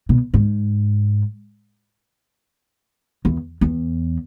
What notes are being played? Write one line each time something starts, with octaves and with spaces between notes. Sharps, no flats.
B2
G#2
E2
E2